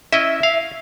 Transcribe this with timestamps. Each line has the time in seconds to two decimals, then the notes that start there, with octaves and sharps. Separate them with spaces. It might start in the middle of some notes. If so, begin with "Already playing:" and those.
0.12 C#4 E4 D#5 E5
0.43 F5